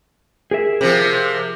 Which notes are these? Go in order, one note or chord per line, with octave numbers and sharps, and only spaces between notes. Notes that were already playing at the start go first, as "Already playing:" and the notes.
G#4 A#4 E5
C3 F3